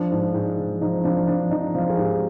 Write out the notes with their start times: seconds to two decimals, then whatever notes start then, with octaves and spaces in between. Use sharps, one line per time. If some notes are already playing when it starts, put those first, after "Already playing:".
Already playing: F3 D4
0.11 G#2
0.34 G#2
0.58 F3
0.81 F3 D#4
1.04 F3 D4
1.28 F3 D4
1.51 F3 D#4
1.74 F3 F4
1.90 G#4
1.97 G#2 G4